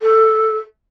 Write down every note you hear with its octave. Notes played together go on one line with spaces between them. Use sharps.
A4